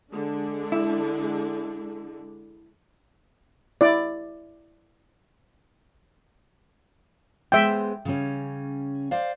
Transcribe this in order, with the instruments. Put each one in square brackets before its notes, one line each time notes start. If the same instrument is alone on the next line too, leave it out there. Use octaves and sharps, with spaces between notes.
[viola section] D3 G#3 D4
[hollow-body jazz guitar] E4
[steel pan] E4 D5
[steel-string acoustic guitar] G#3 B3 C5 [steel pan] E5 G5
[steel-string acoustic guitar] C#3 G3 C#4
C5 D5 F5